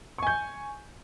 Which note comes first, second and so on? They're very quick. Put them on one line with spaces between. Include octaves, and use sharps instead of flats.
C#6 G#5 G6